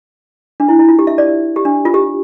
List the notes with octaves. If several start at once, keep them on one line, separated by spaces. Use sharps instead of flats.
D4
E4
E4
F4
G4
E5
D5
G4
D4
F4
G4